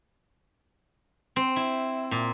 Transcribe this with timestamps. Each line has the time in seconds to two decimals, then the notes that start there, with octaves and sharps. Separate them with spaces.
1.36 C4
1.56 E4
2.11 A#2